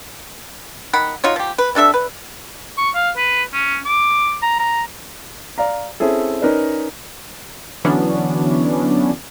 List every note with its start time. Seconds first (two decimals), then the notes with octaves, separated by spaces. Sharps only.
0.93 D#3 F#5 B5
1.24 D#4 F4 F#4 C#5
1.36 F3 G4
1.58 B4
1.75 C3 D4 A4 E5
1.94 B4
2.78 C#6
2.95 F5
3.17 B4
3.53 C#4
3.86 D6
4.42 A#5
4.59 A#5
5.58 D5 F5 A#5
6.00 C4 C#4 E4 G#4 A4
6.42 C#4 D#4 A#4 B4 D5
7.84 D3 E3 F#3 B3 C#4 D4